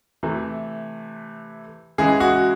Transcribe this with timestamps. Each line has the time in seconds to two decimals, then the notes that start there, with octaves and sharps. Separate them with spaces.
0.23 C3 E3 A3
1.98 C#3 E3 G#3 G#4
2.20 F#4